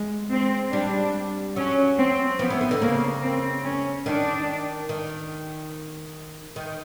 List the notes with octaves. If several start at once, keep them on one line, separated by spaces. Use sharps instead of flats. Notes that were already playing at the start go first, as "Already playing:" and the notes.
Already playing: G#3
C4
G3 D4
F#3 C#4
C4
F3 B3
E3
D#3
D3
C#3 A#3
C4
C#4
D#3 D4
D#3
D#3